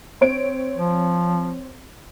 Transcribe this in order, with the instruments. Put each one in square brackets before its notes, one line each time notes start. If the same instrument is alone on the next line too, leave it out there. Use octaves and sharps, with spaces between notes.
[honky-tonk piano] C4 C#5 D7
[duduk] F3